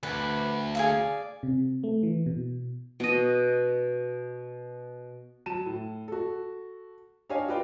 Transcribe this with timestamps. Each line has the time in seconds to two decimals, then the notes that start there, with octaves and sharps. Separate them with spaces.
0.03 D2 B4
0.75 G#4 D5 F5
1.43 C3
1.84 A3
2.03 E3
2.26 B2
3.00 B2 D#5
5.46 F#3 A5 D#7 E7
5.66 A2
6.08 F#4 A4
7.29 D4 G4 C#5 D#5 F5 G#5
7.48 F4 F#4 B4 D5 F5 G5